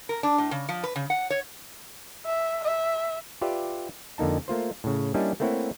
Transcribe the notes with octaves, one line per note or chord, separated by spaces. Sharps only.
A#4
D4
A2
C#3
F3
B4
C#3
F#5
C#5
E5
E5
F4 G4 B4 D5 E5
F2 D3 A#3 D#4 A5
A3 A#3 F4 C5
A2 C#3
G3 A#3 C#4 D4 E4 D#5
A3 A#3 C4 E4 C#5 F#5